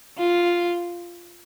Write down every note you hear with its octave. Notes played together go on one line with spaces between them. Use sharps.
F4